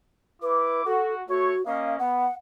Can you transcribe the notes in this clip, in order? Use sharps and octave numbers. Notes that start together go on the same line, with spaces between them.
E4 B4 D6
F#4 A4
A3 F#4 C#5
A#3 C#4 D#5 F5
B3 F#5